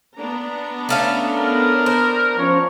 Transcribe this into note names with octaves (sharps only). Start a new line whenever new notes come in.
B3 D4 A#5
A3 C#4 F5 A5
A#4
C5
F3 C#4 C5 C#5